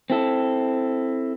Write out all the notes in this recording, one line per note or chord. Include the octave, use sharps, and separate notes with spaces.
C4 E4 A4